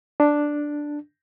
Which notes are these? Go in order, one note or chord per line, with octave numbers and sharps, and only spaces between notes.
D4